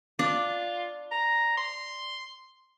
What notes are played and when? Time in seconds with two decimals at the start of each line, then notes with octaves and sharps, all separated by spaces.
0.19 D4 F4
1.11 A#5
1.57 C6